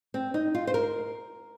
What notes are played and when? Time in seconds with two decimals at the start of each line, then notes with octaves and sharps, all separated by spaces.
0.14 C4
0.34 D#4
0.55 F4
0.67 C5
0.74 A#4